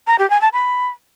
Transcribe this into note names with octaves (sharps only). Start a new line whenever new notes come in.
A#5
G4
G#5
A5
B5